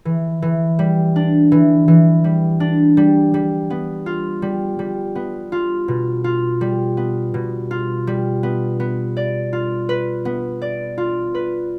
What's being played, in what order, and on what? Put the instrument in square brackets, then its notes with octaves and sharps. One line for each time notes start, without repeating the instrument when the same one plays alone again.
[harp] E3
E3
G3
D4
E3
E3
G3
D4
G3
G3
B3
F4
G3
G3
B3
F4
B2
F4
G3
B3
B2
F4
G3
B3
B3
D5
F4
B4
B3
D5
F4
B4